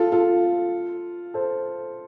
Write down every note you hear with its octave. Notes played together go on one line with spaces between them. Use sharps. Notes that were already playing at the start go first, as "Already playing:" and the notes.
Already playing: F4 A4
F4 A4
A4 C5